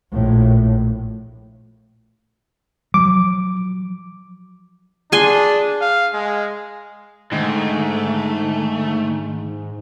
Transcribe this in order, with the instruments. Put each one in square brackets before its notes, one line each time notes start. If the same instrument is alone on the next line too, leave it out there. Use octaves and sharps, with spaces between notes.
[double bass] A#1 A2
[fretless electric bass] F3 F#3 [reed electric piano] D6
[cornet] D4 [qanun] G#4 G#5 C6
[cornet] F5
G#3
[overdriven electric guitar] G#2 [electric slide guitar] D3 D#3 [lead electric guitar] A3